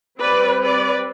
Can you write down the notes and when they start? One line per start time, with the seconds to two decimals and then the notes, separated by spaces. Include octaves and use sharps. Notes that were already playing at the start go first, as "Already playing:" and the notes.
0.20 G3 C4 B4 D5
0.62 B4 D5